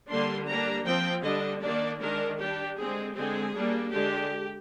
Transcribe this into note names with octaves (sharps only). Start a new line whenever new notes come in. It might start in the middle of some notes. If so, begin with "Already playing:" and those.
D3 G3 A#3 D4 C6
G3 A#3 D4 A#5
F3 C4 G5
D3 G3 D4 D#5
D#3 A#3 D4 D5
D#3 G#3 D4 A#4
G3 D4 G4
D3 G#3 C4 G#4
D3 G#3 C4 G#4
G3 A#3 D4
D3 G#3 D4 G4